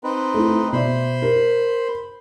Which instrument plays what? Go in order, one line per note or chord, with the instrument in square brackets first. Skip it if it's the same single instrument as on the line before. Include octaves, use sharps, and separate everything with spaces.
[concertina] C4 D#4 B4
[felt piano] A3 E4
[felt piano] B2 D5 E5 [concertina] C5 B5 C6
[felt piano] A#4